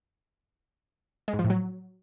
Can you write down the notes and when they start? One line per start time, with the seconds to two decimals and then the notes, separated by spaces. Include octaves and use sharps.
1.28 G#3
1.33 G#2
1.39 F3
1.44 A2
1.50 F#3